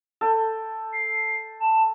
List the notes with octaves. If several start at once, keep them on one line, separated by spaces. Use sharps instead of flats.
A4 G5
C7
A5